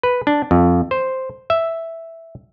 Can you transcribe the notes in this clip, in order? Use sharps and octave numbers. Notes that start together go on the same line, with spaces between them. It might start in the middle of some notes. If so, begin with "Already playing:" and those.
B4
D4
F2
C5
E5